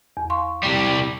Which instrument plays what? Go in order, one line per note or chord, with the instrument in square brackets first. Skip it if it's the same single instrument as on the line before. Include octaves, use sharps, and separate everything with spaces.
[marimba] E2
F5 C6 C#6
[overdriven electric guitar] C2 G3